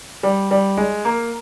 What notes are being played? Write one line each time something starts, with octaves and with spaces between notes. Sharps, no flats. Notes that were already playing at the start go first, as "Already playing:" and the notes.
G3
G3
G#3
A#3